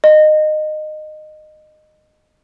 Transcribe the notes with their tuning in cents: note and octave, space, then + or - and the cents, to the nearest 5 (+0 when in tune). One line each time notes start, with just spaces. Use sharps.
D#5 -20